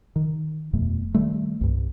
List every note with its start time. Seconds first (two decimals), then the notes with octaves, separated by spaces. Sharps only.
0.16 D#3
0.73 D#1 F2 B2 A3
1.15 D#3 G3 A3
1.61 C2 G2